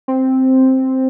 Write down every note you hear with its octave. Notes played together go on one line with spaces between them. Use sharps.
C4